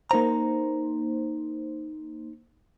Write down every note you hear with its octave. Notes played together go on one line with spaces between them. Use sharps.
A#3 D#4 C5 A#5